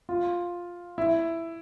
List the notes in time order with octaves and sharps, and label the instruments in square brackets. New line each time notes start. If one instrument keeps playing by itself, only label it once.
[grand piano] F4
E4